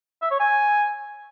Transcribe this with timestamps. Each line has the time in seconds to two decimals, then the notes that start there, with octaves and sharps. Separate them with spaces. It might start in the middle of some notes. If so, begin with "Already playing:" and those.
0.22 E5
0.31 C#5
0.40 G#5